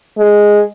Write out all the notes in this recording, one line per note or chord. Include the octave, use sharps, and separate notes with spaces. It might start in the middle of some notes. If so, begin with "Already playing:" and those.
G#3